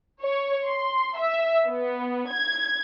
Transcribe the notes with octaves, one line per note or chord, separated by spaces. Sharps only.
C#5
C6
E5
B3
G#6